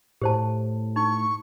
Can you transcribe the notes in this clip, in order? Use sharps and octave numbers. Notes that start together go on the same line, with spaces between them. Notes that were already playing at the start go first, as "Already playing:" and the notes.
A2 G4 C5 A5
D#4 C#6